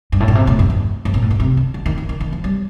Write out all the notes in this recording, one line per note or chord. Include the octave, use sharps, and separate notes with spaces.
G2
A2
A#2
C3
A2
G2
F2
G2
A#2
A2
A#2
C3
D3
D3
D#3
D#3
D#3
D#3
F3
G3